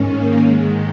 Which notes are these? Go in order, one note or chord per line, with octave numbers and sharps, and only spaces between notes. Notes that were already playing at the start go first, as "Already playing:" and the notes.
Already playing: G#2 D#3 C#4
A#3
G#2 D#3 G#3